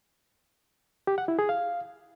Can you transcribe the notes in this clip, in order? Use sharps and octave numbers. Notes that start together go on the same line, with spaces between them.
G4
F#5
E4
G#4
F5